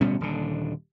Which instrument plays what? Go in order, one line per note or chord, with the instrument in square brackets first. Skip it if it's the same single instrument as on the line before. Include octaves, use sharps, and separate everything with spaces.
[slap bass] D1 B2 G3 C#4
D#1 D3